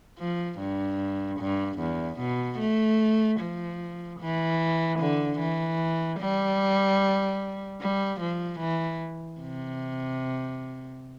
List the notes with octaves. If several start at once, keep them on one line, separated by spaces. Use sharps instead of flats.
F3
G2
G2
E2
B2
A3
F3
E3
D3
E3
G3
G3
F3
E3
C3